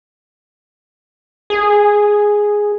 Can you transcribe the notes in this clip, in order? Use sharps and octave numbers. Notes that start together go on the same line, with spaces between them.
G#4